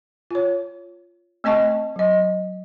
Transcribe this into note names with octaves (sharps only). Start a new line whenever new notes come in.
F4 C#5
A3 C4 D#5 A5 C#6
F#3 D#5